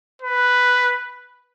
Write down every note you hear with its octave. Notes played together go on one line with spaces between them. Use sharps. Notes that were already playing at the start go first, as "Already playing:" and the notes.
B4